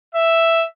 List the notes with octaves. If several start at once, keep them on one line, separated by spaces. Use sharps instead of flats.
E5